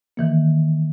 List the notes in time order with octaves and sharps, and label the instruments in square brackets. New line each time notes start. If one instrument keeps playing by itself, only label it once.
[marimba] D#3 E3 A#3